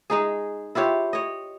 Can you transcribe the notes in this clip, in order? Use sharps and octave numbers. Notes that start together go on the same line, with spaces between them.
G#3 D#4 G#4
E4 F4 G4 C#5
C#5 D#5